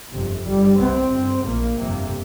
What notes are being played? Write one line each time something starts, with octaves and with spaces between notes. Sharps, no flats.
G1 F2 C3
G1 G2 G3
C2 C3 C4
G1 G2
A#1 A#2 A#3
G1 F2 C3